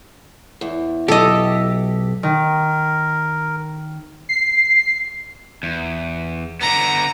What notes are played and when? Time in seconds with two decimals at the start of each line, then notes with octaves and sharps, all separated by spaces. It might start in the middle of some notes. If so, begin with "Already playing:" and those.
0.61 E2
1.08 B1 G4 A4 D#5
2.23 D#3 A#4
4.29 C7
5.63 E2
6.61 D3 B3 A#5